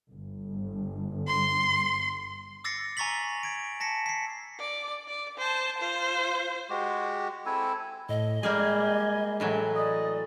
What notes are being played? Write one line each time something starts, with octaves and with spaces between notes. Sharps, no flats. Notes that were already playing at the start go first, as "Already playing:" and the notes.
G1
C6
D6 E6 A6 A#6 C7 C#7
G#5 A#5 C#6 A6 B6 F#7
G#6 D7
A5 A#6 B6 C#7
B6 C7
D5
D5
C5 A5
F4 C5
G#3 F#4 G4
C4 E4 A4 G#5
A2 D#5
G3 G#3 A#3 G#4 G#5
A2 E3 F#3
D5 D#5